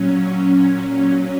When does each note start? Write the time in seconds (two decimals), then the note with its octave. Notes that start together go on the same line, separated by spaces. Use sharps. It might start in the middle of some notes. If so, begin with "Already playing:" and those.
Already playing: A#2 F#3 C#4
0.52 A#2 F#3
0.86 C#4